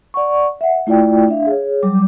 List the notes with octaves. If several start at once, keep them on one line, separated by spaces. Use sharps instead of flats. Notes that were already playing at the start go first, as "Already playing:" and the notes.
D5 F#5 C#6
E5 F#5
A3 E4 F4 D5 G5
D4 E5 F5
G#4 C#5
F#3 G3 D6